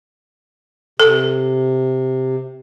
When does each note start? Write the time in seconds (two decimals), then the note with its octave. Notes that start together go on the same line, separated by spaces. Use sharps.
1.00 C3 A4